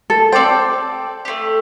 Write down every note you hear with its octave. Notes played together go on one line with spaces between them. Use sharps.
A4
C4 A4 C5 D5 G5
A3 C4 G4